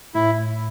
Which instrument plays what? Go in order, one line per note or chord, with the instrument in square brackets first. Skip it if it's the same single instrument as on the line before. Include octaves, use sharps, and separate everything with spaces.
[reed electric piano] A2 [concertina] E4